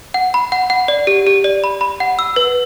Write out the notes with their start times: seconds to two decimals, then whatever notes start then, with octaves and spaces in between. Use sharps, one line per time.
0.14 F#5
0.34 B5
0.52 F#5
0.70 F#5
0.88 D5
1.07 G4
1.27 G4
1.44 D5
1.64 B5
1.81 B5
2.00 F#5
2.19 E6
2.36 B4